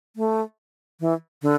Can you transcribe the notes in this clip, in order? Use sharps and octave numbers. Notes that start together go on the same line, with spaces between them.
A3
E3
D3